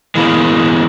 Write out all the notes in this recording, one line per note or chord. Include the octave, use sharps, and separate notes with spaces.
E3 G#3 A#3 B3